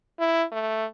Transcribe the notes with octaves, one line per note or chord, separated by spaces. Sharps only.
E4
A3